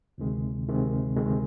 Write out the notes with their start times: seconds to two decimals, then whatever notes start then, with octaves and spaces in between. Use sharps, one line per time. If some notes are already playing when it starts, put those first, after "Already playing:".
0.18 D2 C3 D#3 G#3
0.67 D2 C3 D#3 G#3
1.16 D2 C3 D#3 G#3